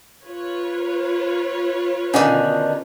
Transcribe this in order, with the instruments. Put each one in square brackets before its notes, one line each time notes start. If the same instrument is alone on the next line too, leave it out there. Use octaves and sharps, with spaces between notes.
[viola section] F4 B4 C#5
[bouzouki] B2 D3 D#3 [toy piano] C#4 D4 F5